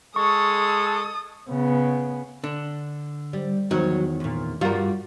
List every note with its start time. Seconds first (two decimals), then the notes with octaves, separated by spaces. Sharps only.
0.16 G#3 A4 C#6 D#6
1.49 C#3 B3
2.44 D3 D4
3.33 G3
3.71 E2 D#3 F#3
4.20 D2 A#2
4.61 G2 G3 F4 F#4 A#4